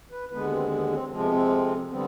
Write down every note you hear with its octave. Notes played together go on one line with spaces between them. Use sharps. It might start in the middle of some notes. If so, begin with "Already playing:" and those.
B4
D#2 D3 G#3 B3 B4
C4
B3
C4
F2 C3 F3 G#3 C4
B3
C4
D3 G3 B3 C4